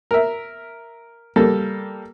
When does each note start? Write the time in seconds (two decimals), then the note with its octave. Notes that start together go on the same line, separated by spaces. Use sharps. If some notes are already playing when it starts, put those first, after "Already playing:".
0.11 A#4 E5
1.36 G3 A#3 A4